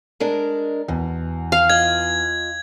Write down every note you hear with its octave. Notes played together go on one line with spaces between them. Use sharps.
G#3 D4 A#4
E2 B2
F5
F4 D#5 G#6